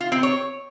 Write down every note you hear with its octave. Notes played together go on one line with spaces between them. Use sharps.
F4
C4
C#5